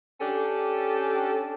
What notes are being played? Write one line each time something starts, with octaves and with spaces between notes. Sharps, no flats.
C#4 D4 G4 A4